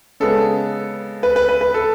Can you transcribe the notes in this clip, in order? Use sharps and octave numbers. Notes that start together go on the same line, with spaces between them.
C#3 G#3 B3 A4
B4
B4
B4
B4
A4